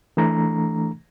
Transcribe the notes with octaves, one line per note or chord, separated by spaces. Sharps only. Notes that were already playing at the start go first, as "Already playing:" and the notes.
E3 A3 D4 A#5